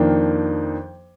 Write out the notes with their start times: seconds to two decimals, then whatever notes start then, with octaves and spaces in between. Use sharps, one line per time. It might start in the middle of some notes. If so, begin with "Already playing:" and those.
Already playing: F2 D#3 A#3 D4 G5